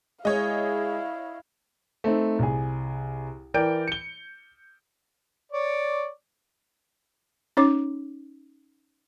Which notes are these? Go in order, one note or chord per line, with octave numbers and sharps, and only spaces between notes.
G#3 E4 G#4 C#5 D#5 F5
A3 C4 D#4
C2 G#4
E3 A#4 D5 G5 G6 D7
C#7 G7
C#5 D5
C#4 D#4 C#5 D6